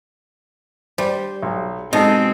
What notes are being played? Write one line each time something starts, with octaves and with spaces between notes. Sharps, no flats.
G3 C5
B1
B2 G#3 C4 D#4 A4